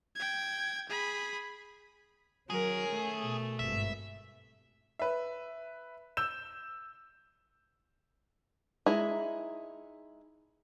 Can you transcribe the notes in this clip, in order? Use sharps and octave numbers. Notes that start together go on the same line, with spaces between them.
G5 G#6
G#4 B5
D#3 F#3 C#4 G#4 A#4
A3
B2
G#1 G2 E5
B4 E5
E6 G6 E7
G#3 D#4 E4 G#4 A#5